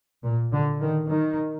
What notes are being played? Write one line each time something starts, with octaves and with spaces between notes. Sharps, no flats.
A#2
D3
D#3
D#3